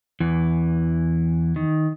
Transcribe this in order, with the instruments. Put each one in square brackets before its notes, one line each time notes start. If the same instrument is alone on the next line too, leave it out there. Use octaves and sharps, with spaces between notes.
[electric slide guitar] E2 E3
D#3